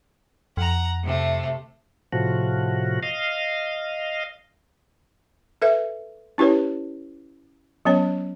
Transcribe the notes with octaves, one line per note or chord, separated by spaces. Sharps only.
F2 F#5 A#5
C3 A3
A2 C3 F3 F#4
D#5 F5
A4 B4 E5
C#4 E4 G4 B4 C#5
F#3 B3 C#4 C#5